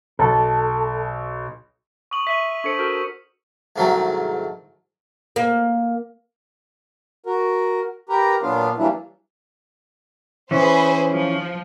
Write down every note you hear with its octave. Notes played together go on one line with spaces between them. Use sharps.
B1 A4
C#6 D#6 F#7
E5 C#6 B6 D#7 F#7
D4 A4 C5 C#6 C#7
F#4 A4 A#4
C2 G#2 D#3 F#3 A3
A#3
F#4 A#4
G4 A#4 B4 A#5
A#2 F#3 B3 D4 F4 F5
E3 F#3 G3 A#3 D4 E4
E3 C#4 G#4 B4 C5
F3